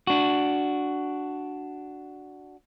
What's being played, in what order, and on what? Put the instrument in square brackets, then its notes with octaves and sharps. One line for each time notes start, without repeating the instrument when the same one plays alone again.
[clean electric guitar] D4 F#4